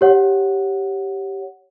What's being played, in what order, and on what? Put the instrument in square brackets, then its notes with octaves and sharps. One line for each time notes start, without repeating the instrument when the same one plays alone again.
[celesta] G4 C#5 F#5